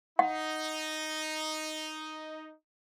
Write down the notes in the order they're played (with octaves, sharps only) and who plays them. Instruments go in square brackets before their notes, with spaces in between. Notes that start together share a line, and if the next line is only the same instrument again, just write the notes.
[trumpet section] D#4 [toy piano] F#5